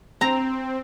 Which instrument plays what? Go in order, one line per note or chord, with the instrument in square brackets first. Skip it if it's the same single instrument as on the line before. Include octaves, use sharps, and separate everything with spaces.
[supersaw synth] C4 [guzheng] A#5